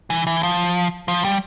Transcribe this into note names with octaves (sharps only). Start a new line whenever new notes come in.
E3
E3
F3
F3
G3